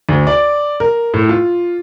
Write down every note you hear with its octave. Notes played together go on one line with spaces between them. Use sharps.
D2
D5
A#4
A2
F4